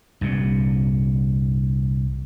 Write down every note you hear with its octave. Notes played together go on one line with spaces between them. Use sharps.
C2 G2 A#2